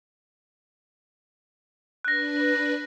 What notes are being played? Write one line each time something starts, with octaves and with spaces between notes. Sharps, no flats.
D4 B4 F#6 A#6